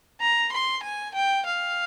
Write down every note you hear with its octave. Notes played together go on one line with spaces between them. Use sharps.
A#5
C6
G#5
G5
F5